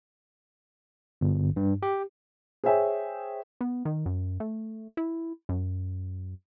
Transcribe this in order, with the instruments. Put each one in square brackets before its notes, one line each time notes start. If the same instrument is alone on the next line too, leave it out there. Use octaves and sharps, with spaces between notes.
[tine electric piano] G1
G2
G4
[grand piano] G#4 C5 C#5 E5 G5 G#5
[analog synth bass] B3
D#3
F#2
A3
E4
F#2